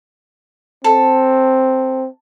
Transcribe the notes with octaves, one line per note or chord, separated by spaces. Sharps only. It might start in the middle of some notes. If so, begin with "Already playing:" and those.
C4 A4